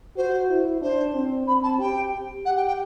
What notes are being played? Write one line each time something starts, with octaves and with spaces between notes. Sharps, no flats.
F#4 C5
E4
D4 C5
C4
C4 B5
A5
G4 G5
G4 F#5
G5
G5